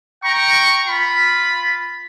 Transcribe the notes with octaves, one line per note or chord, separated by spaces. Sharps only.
G5 A#5 C#6
F4 B5